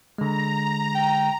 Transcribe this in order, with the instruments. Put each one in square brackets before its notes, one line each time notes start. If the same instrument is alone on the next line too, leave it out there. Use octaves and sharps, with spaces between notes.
[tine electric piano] D3 G#3 [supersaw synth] A#5
[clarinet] G5